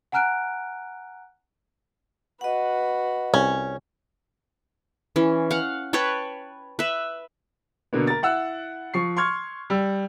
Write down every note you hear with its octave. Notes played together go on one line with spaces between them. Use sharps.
F#5 G#5 A#5 F6 F#6 D7
F#4 B4 D#5 F#5
C2 C#4
E3 C#4
F5 F#5
B4 C#5 G5 A5
B4 E5
B2 D3 A#3 B3
A#4 A6
E4 F#5 E6 F#6
F3 C#6 C7
C6 C#6 F6 G#6
G3 E6